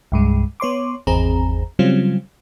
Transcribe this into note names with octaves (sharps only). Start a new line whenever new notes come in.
C2 G2 G#3
B3 C#5 C6 D6
G#1 E2 C4 G#4 A#5
C#3 F#3 G3 C4 C#4 F4